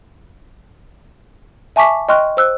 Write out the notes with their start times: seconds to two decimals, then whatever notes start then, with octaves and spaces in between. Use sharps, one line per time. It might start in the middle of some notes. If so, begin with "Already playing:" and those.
1.76 E5 G#5 A5 C#6 D6 B6
2.09 D#5 G5 C6 C#6 F6 F#6
2.37 C5 E6 F#6